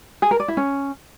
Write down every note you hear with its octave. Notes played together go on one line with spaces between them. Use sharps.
G#4
A#4
D5
E4
C#4